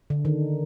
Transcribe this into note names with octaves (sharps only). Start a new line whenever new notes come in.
D3
D#3